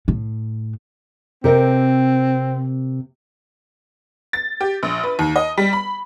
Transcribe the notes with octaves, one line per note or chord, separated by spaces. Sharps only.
A2
C3 C4 A#4 D#5
A6
G4
A#1
B4
D#2
D#5
G3
B5